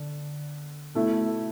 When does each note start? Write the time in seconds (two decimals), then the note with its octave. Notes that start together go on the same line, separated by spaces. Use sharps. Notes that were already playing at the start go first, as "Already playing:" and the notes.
Already playing: D3
0.94 B2 A3 E4